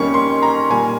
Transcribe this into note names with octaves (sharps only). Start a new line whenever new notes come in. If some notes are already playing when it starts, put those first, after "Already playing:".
Already playing: F2 D#3 G3 A#3 C#4 C#6
C6
A#5
A#2 G3 A#3 G#5